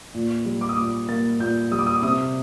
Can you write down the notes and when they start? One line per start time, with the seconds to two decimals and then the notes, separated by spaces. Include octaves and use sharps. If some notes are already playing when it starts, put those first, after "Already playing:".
0.15 A#2
0.45 G3
0.61 D6
0.69 D#6
0.76 A#2 D6
1.08 A#3 A6
1.40 A#2 G6
1.71 G3 D#6
1.79 D6
1.86 D#6
1.96 D6
2.02 C3 D#6